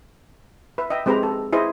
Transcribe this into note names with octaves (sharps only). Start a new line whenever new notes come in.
B4 E5
D#5 E5 G5
G#3 C4 G4 B4 C5 A#5
A4
E4 G#4 B4 C5 D#5